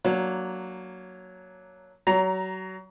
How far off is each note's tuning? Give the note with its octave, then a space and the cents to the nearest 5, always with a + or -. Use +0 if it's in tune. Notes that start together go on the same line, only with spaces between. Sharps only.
F#3 +0 A#3 +0 D4 -15
F#3 +30 A#5 +0